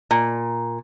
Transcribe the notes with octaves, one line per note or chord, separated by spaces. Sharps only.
A#2